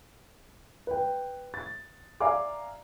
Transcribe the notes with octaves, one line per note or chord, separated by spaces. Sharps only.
B4 G5
A6
D5 E5 F5 G#5 A#5 D6